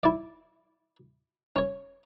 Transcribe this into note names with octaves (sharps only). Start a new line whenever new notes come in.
E4 D5
C#4 C#5